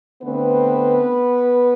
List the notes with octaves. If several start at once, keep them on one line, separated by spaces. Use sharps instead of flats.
D3 A3 B3 C4 B4